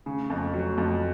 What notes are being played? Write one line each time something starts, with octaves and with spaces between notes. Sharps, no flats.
C#3
F2
F#3
F2